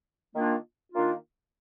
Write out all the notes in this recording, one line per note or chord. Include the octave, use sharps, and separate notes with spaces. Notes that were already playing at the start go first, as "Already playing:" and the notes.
D#3 A#3 D4 F4
D#3 A#3 D4 F4